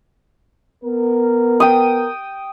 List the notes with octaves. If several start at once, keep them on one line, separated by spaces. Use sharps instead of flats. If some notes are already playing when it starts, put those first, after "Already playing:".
B3 A#4
G5 D#6